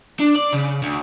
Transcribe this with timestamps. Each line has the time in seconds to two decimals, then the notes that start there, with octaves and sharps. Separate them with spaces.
0.20 D4
0.36 D5
0.52 C#3
0.83 D2